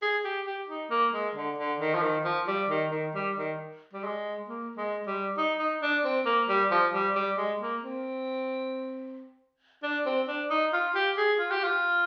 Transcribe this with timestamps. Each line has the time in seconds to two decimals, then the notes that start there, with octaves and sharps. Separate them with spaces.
0.02 G#4
0.25 G4
0.46 G4
0.69 D#4
0.90 A#3
1.13 G#3
1.35 D3
1.58 D3
1.80 D#3
1.94 F3
2.03 D#3
2.25 F3
2.48 G3
2.69 D#3
2.91 D#3
3.15 G3
3.36 D#3
3.94 G3
4.04 G#3
4.48 A#3
4.77 G#3
5.07 G3
5.38 D#4
5.59 D#4
5.82 D4
6.05 C4
6.26 A#3
6.49 G3
6.71 F3
6.94 G3
7.15 G3
7.37 G#3
7.61 A#3
7.83 C4
9.83 D4
10.06 C4
10.28 D4
10.50 D#4
10.73 F4
10.95 G4
11.17 G#4
11.39 F4
11.51 G4
11.64 F4